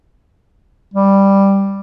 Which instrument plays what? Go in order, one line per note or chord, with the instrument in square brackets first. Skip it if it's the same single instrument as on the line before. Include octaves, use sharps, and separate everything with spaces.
[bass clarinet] G3